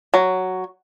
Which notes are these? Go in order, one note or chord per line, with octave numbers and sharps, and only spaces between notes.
F#3